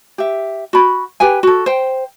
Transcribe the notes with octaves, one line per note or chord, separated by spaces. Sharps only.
G4 E5
F#4 B5
G4 B4 G5 G#5
F#4 A4
C5 G5